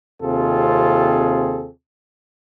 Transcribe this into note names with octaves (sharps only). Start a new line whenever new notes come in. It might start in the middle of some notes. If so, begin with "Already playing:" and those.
D#2 C3 C4 F4 G#4 A4